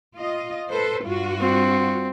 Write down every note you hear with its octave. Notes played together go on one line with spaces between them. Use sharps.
F4 D#5
A4 B4 C5
G2 F4 F#4
C4